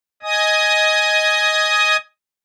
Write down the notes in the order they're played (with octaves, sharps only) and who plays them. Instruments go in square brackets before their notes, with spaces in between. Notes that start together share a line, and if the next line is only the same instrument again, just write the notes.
[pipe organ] D#5 G#5 D#6